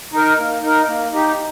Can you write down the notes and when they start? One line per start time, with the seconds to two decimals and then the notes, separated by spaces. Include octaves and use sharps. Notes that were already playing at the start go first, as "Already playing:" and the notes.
0.13 D#4 A#4
0.38 A#3
0.62 D#4 A#4
0.87 A#3
1.12 D#4 G4